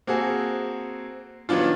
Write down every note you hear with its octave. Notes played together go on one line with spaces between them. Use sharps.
A#3 C4 F#4 G#4 A4
D#3 F#3 B3 D4 F4